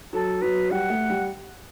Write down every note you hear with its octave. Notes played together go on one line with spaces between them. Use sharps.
F#3 A4
F#3 B4
G3 F#5
A3
G3